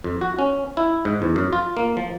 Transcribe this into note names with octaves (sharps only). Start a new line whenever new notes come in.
F2
F#4
C#4
E4
G#2
E2
F#2
F4
A#3
F3